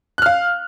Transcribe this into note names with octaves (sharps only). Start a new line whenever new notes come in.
F5 F6 F#6